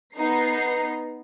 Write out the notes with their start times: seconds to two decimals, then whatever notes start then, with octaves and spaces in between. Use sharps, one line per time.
0.14 B3 D#4 A#5 C7